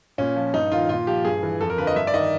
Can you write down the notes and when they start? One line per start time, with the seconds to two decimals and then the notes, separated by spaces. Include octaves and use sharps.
0.18 A#2 C#4
0.36 F3
0.54 G2 D#4
0.71 D#3 F4
0.89 A#2 F4
1.07 F3 G4
1.25 G2 G#4
1.43 E3
1.61 F2 A4
1.70 A#4
1.78 D3 F3 B4
1.87 D#5
1.96 G2 E5
2.07 D5
2.14 D#3 D#5